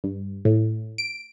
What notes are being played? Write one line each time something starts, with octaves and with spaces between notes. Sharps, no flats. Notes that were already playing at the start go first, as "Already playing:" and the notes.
G2
A2
D7